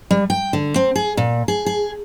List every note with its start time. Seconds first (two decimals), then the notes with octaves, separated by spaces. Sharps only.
0.11 G3
0.30 G5
0.53 D3
0.76 C4
0.96 G#4
1.17 A#2
1.48 G#4
1.66 G#4